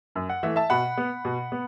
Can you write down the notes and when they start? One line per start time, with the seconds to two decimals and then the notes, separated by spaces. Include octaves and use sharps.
0.15 F#2
0.29 F#5
0.43 E3 A3 E5
0.56 E5 A5
0.70 B2 F#5 B5
0.98 B3
1.25 B2
1.52 B3